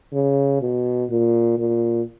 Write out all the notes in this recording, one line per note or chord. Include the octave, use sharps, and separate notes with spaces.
C#3
B2
A#2
A#2